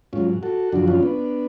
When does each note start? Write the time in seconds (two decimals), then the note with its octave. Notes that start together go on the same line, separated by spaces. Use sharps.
0.13 G#2 F#3 C#4 F4
0.43 F#4 A4
0.72 F#2 D3 F3 D4 F#4
0.88 C#4 F4
1.03 B3 D4